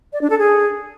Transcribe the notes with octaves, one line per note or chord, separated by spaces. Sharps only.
D5
D4
A4
G#4